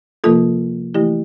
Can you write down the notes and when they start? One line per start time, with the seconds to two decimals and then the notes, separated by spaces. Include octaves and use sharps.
0.24 C3 F3 A#3 F4 A4
0.94 E3 A3 E4 G4